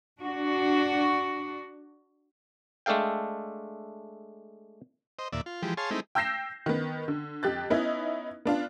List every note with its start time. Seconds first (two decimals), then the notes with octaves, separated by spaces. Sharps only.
0.20 D4 F#4
2.86 G#3 A3 D4 A4 F5 G5
5.19 C5 D#5
5.33 D#2 A#2 D5 E5
5.46 F4
5.62 E3 F3 G#3 G4
5.77 G#4 C#5 F5 A5 C6
5.91 G#3 A3 C4 D#4 E4
6.15 G5 E6 G6 A#6 C7 E7
6.66 D#3 B3
7.08 D3
7.43 F2 G4 F#6 A6
7.70 B3 C#4 D#4 E4
8.45 B3 D4 F4